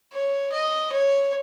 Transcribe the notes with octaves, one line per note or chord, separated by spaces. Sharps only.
C#5
D#5
C#5